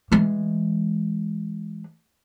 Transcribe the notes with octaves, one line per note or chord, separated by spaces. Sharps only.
E3 G#3